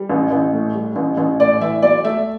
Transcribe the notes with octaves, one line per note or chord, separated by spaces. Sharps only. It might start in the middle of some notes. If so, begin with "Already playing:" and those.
Already playing: G3
A1
A1
A2
G3
A1
A1
A2 D5
E3 E5
B1 D5
A3 E5